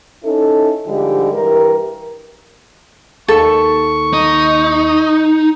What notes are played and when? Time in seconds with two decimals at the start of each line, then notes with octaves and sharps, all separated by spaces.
0.24 C#4 D#4 E4 A4
0.86 G#2 D3 F3 G3 G#3 G4
1.33 G2 E3 G4 A#4
3.28 D#2 A4 C#6
4.13 D#4